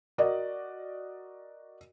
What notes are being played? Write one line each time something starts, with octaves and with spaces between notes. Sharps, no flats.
F#4 A#4 D5 D#5